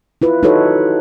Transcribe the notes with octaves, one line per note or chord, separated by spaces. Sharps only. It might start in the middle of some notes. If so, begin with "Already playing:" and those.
E4 F4 B4
D#4 E4 F#4 A4 B4 C#5